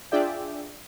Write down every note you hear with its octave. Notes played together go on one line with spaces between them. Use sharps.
D4 F4 G#4 D5 E5 G5